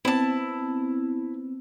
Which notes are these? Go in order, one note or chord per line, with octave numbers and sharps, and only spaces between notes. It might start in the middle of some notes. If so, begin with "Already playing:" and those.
B3 C4 E4 A5